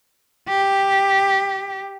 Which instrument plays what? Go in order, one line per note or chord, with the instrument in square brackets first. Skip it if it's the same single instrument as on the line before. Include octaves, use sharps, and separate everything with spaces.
[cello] G4